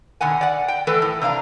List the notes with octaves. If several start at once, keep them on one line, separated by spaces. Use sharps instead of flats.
B2 D3 D#3 F#5 G#5
D5 F#5
G5
E3 A3 A4 B4
A2
C3 D4 F5 A#5